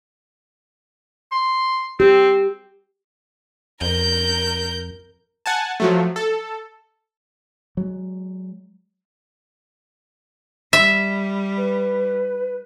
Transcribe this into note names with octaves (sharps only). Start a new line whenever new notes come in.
C6
C4 G4
F2 A#4 G6
F#5 G#5 A5
F3 F#3 A3
A4
F#3 G#3
G3 E5
B4